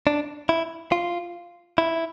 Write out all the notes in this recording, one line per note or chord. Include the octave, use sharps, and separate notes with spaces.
D4
E4
F4
E4